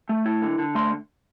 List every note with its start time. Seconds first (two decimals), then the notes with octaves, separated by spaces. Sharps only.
0.09 A3
0.26 E4
0.42 D3
0.58 D3
0.75 A3 C6